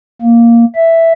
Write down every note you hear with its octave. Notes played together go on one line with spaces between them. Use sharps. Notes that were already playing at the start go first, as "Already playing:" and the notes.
A#3
E5